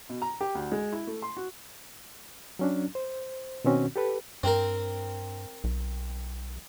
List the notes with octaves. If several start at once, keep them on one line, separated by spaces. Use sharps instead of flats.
B2
A#5
G4
D2
G#3
E4
A3
C6
F#4
F#3 C#4 D4
C5
B2 D#3 C4 C#4 F#4
G4 A4 B4
G2 C4 A#4
B1